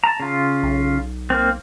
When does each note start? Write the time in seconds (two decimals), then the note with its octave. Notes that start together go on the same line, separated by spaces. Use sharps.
0.04 A5 A#5
0.20 C#3 F4
0.63 B1
1.30 A#3 C4